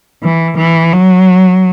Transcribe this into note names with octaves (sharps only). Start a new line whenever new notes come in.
E3
E3
F#3